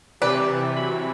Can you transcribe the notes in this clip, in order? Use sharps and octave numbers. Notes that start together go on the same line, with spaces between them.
C3 E3 G4 B4 D5
F#3 B5